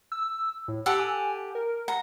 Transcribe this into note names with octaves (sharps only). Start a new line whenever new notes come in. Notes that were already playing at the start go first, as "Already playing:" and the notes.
E6
A2
G4 A4 F#5 E6
G#5
A#4
F#5 A#5